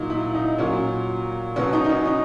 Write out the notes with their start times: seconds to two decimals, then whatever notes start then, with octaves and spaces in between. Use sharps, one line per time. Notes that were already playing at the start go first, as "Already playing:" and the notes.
Already playing: A#2 F#3 D#4
0.10 E4
0.35 D#4
0.58 A#2 F#3 C#4
1.56 B2 F#3 C#4
1.73 D#4
1.84 D#4
1.89 C#4
2.06 D#4